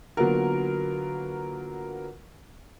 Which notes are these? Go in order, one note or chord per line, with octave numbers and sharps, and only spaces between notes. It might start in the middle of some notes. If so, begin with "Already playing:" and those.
D3 F#3 A#3 B3 F4 A#4